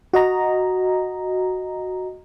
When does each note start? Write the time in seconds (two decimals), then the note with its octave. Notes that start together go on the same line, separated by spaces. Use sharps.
0.13 F#4 D#5 A#5